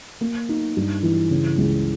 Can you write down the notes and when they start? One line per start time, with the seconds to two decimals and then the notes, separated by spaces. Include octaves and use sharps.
0.21 A#3
0.49 D#4
0.77 G2
1.03 E3
1.31 C#3
1.58 C#2